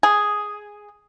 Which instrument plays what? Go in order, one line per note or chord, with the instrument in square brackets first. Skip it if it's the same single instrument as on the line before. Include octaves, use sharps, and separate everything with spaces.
[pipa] G#4